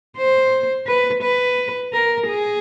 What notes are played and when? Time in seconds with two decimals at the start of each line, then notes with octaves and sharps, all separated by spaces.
0.17 C5
0.86 B4
1.22 B4
1.93 A#4
2.28 G#4